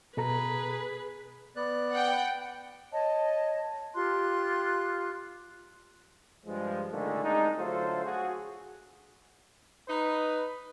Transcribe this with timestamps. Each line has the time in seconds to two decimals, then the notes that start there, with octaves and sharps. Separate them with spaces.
0.17 B2 G#4 A4 B4 A#5
1.56 B3 D5 F#6
1.94 F#5 G5
2.93 C#5 D#5 A5
3.95 F4 G4 C6 F#6
6.46 G2 F3 G#3
6.91 A#2 D3 D#3 G#3 A3
7.24 C2 G#3 D4 D#4
7.57 D3 F#3 A3 F4 A4 C5
8.05 F#4 G#4
9.88 D#4 B4